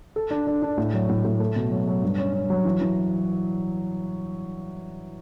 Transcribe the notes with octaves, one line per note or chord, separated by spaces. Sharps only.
A4
D4
D4
D4
A2
F#3
A2
A2
A3
B2
F#3
F#3
G2
C#4
C#4
F#3
E3
E3